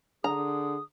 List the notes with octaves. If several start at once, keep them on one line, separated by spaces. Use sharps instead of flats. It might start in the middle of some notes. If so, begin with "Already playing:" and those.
D3 G#4 A#5 D#6